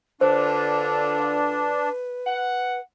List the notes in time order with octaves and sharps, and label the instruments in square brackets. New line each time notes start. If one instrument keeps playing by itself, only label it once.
[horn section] D3 F4 [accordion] D4 [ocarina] B4 [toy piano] C5
[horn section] F#5